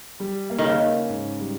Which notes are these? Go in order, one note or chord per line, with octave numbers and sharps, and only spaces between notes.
G3
A#3
D#3
C#3
C#4
G#2
G3